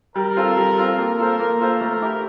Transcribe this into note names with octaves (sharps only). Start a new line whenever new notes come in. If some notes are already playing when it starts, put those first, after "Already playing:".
G3 A#4
C4 F4 A4
G3
C4 F4 A4
A#3 A#4
F4 A4 C5
A#3
F4 A4 C5
A3 A#4
E4 G4